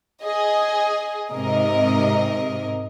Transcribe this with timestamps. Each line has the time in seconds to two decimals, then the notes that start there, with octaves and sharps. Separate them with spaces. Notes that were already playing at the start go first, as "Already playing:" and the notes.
0.24 G#4 D#5
1.31 G#2 C3 A#4 D#5